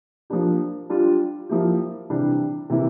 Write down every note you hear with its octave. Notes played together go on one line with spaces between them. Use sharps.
F3 A#3 D4 G4
G3 D4 F4
F3 A#3 E4 G4
C3 E3 G3 D4 G4
C3 E3 A#3 E4